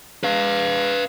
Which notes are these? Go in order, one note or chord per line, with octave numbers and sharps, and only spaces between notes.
B4 F5